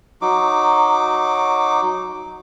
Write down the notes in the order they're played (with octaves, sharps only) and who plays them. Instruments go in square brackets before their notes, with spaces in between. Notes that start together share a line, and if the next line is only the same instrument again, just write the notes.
[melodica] F#3 D#4 D6